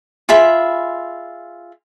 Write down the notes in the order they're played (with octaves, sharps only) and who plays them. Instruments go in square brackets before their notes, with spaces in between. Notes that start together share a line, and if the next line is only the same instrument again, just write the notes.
[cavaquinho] F4 G#4 E5 B5